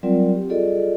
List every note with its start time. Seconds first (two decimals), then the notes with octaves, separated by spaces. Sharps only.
0.03 F#3 G3 C4 F4 A#4 D5
0.35 G4
0.49 F4 G#4 A4 D5 D#5